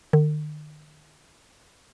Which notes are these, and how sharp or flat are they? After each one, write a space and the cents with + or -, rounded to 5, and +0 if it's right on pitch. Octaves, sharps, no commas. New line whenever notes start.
D#3 -45